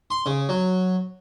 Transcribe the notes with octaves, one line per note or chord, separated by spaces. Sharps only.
C6
C#3
F#3